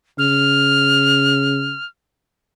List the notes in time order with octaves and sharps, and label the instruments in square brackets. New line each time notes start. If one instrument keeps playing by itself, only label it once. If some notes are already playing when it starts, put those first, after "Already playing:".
[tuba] C#3 [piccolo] F6